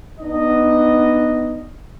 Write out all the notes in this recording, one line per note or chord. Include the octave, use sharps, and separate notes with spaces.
B3 D4 D#4 D#5